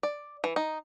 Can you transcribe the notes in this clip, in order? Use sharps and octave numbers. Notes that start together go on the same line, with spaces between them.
D5
E3
D#4